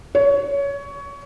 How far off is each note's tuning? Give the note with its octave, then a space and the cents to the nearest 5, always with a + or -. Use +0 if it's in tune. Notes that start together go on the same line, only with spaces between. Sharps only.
C#5 +20